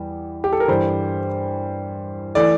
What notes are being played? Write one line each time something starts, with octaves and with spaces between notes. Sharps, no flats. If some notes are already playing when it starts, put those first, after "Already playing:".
Already playing: E2 G3
G4
A4
A#4
G2 E3 G3 C5
E3 A3 D5